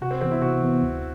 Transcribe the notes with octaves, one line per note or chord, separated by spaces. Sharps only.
C3 F#4
C4
E3 B3 C4
E4
C3 F#4
E3 B3
D2